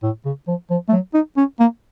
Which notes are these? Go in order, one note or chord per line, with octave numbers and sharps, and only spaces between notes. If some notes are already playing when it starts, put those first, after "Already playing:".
A2
C#3
F3
F3
A3
F#3
D#4
C#4
A#3